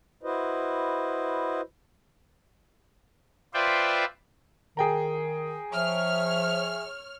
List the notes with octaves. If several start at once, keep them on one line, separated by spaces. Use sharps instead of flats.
E4 F#4 B4 C5 D#5
F4 B4 C5 D5 E5 G5
D#3 G#4 G5 A#5
F3 C#5 E5 F6